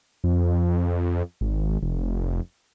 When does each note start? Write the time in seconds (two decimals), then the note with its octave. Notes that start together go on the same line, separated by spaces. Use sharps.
0.24 F2
1.41 G#1
1.83 F1